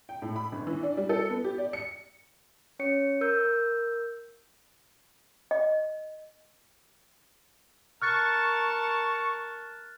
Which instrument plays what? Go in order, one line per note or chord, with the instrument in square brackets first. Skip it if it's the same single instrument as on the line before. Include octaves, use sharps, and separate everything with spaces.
[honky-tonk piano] G5
A2
B5
G1
E3
D4
G3
A4
B3
G4
D5
C#7
[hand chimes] C#4 C#5 C#7
A#4 E6 G6
[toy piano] D#5
[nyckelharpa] A#4 A5 [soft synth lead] C#6 [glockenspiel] F6 F#6 A6